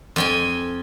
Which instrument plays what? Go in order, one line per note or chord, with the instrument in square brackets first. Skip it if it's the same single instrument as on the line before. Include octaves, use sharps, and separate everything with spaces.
[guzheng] F2 G5 G#5